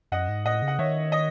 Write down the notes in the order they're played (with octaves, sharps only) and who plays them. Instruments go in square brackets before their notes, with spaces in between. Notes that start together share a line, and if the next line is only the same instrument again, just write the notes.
[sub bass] F#2 [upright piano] D#5 F#5
[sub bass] G#2
[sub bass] A2 [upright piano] D#5 F#5
[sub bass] C#3
[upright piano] F#5
[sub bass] D#3 [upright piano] C#5 E5
[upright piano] D#5